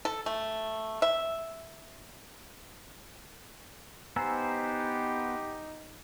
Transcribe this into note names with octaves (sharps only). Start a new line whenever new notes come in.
A4
A3
E5
B3 D#4 G4 C5 G#5 A#5 E6